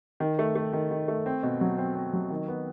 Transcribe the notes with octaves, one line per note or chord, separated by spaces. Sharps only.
D#3
A3
A3
D#3
D#3
A3
C4
B2
F#3
C4
C4
F#3
D#3
B3